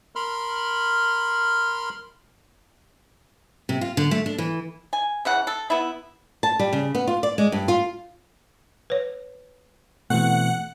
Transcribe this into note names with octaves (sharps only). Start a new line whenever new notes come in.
A#4 B5 C6 F6
C3
F4
D3
A3
D4
E3
G#5
C#3 E3 F#5
A4
B3 E4
A5
G3
C#3
B3
F4
D5
G#3
G2
F4
B4 C#5
B2 E3 A3 C4 F#5